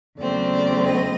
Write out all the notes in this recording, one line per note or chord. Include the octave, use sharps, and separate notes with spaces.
E2 C#3 F#3 A3 C4 D5
D5
D#5